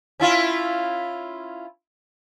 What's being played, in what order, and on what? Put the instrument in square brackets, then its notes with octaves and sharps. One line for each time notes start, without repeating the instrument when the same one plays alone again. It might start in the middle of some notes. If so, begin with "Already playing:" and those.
[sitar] C#4 E4 F4